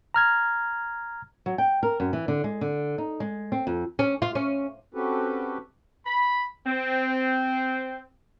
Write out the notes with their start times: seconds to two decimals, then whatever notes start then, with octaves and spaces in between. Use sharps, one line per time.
0.14 A#5 F6 G#6
1.46 F#3
1.58 G5
1.83 A#4
2.00 F#2
2.13 E3
2.28 D3
2.44 G#3
2.61 D3
2.98 D#4
3.20 G#3
3.52 C4
3.67 F2
3.99 C#4
4.22 F4
4.35 C#4
4.94 C4 C#4 F#4 G4 A4 B4
6.06 B5
6.66 C4